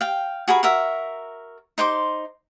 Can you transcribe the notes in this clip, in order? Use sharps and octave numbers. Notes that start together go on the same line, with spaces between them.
F5 G5
F#4 G#4 A#4 B5
F#4 A#4 E5
D#4 C5 C6 D6